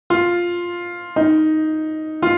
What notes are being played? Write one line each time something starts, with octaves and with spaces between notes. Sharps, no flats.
F4
D#4
F4